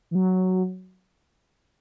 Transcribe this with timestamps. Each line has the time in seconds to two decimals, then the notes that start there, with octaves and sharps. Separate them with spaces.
0.11 E3
0.15 F#3